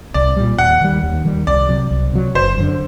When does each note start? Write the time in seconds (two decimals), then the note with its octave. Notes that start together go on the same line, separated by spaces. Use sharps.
0.14 C2 D5
0.37 A#2 G3
0.59 D#2 F#5
0.81 D#3 G3
1.03 D#2
1.25 D#3 G3
1.47 C2 D5
1.69 C3 F#3
1.91 C2
2.13 C3 F#3
2.35 F#1 C5
2.57 F#2 D3